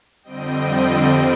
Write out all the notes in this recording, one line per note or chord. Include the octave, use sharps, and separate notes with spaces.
F2 D3 G3 C4 D#5 G5